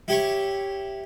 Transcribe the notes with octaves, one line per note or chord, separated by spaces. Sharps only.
E4 G4 C#5 C#6